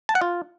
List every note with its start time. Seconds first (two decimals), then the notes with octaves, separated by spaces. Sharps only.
0.09 A5
0.15 F#5
0.21 F4